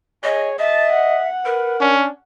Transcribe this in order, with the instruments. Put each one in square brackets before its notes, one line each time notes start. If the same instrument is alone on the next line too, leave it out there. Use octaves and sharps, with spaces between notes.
[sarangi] G#4 [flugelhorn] C#5 [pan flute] D#5
[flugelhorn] D#5 [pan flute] E5 [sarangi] A5
[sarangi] F#5
[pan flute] A#4 [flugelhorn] B4
[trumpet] C#4 [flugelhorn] D4